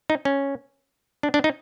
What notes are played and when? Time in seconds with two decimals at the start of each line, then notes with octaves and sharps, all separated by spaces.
0.10 D#4
0.25 C#4
1.23 D4
1.34 D4
1.44 D#4